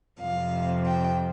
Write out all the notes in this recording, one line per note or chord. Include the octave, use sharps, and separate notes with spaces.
F2 C3 F3 F5
G5